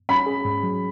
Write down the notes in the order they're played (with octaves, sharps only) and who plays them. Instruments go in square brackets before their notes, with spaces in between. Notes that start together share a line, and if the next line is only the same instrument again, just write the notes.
[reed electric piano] C#4 [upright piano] B5
[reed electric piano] G#4
G#2
F#3